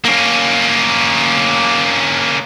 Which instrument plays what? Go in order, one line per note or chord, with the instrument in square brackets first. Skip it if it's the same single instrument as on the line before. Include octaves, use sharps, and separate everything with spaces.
[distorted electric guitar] A#3 C#4